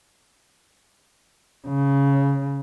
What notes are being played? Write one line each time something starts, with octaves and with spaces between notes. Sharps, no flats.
C#3